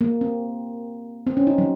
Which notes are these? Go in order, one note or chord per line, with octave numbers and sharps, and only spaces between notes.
A#3
C4
C4
C#4
D#4
F#3